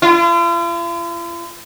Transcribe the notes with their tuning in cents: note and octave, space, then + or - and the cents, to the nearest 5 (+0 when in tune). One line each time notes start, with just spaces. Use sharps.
F4 -45